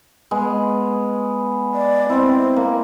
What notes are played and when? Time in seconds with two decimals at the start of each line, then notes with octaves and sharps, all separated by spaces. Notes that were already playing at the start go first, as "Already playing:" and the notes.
0.31 G#3 B3
1.74 D5
2.10 C4 E4
2.56 A#3